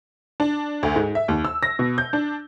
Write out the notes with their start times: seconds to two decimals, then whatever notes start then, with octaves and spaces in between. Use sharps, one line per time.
0.40 D4
0.83 D2
0.96 G#2
1.15 E5
1.28 D#2
1.45 E6
1.63 A#6
1.79 B2
1.98 G6
2.13 D4